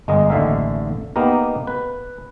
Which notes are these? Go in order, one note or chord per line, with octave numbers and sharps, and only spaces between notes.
G1 G#3 A#4 D#5
A1 D#2 D3 E5 F5
A#3 B3 D#4 G4 A#4
B4